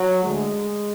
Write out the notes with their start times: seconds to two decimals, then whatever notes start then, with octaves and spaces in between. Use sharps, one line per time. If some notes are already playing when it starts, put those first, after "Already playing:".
Already playing: F#3
0.23 D2 D3 G#3